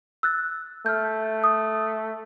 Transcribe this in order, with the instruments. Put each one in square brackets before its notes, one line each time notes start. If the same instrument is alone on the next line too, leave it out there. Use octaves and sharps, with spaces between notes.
[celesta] E6 F#6 A6
[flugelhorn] A3 [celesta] F6 G6
[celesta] D#6